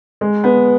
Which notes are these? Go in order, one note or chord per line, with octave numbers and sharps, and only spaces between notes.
G#3
B3